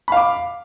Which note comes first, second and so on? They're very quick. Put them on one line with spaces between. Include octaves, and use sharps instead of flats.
B5 F5 D6